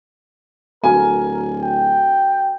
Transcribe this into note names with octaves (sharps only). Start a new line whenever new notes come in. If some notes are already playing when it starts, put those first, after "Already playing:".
D1 F#4 A4 A#4 G#5
G5